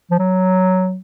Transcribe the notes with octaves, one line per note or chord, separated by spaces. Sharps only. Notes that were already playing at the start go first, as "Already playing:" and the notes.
F3
F#3